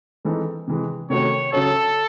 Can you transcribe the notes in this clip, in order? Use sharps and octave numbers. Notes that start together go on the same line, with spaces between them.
E3 G#3 C4 D#4 A4
C3 E3 G#3
C3 D#3 A3 C#4 F#4 C#5
C#3 F#3 C#4 A4